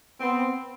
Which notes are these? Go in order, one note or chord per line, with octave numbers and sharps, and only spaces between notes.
B3 C4